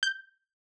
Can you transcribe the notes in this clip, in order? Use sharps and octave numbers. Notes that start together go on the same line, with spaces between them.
G6